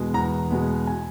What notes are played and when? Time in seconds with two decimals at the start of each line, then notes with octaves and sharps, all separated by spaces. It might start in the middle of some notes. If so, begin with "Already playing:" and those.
Already playing: E2 B2 G#3 B3
0.14 E2 A#5
0.50 B2 G#3 B3
0.87 G#5